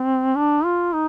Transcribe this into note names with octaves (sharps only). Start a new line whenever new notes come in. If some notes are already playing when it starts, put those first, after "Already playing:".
Already playing: C4
D4
F4
D#4